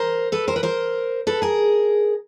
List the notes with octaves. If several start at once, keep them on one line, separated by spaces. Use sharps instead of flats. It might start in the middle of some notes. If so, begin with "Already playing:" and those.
Already playing: A#4 C5
A4 B4
A#4 C5
B4
A#4 C5
A4 B4
G#4 A#4